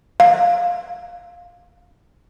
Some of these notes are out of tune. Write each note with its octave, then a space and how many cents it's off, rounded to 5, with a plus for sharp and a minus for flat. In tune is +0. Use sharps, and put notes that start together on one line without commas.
F5 +10